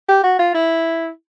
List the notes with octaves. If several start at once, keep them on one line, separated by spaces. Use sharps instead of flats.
G4
F#4
F4
E4